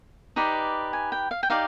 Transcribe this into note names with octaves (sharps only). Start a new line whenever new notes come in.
D#4 G4 B4 D5
G#5
G5
F5
G5
D#4 G4 D5 F5